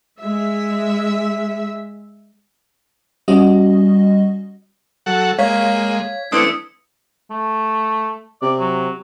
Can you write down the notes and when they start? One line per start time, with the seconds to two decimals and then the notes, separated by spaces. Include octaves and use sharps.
0.19 G#3 E5
3.28 G3 C#4 F#4 D#5
5.06 F#3 A4 F#5
5.39 G#3 A#3 C#5 F5 G#6 B6
6.32 E3 A3 C4 D4 D#6 E6 C#7
7.31 A3
8.42 C3 D5
8.60 F#3